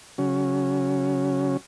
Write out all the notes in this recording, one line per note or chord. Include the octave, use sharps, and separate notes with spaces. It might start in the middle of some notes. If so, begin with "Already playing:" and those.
C#3 F#3 C#4